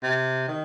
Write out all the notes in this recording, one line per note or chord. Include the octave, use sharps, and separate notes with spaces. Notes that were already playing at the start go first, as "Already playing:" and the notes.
C3
D#3